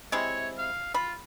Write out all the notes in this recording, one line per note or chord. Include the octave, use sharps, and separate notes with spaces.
C3 G#3 E4 C#5
F5
F4 B5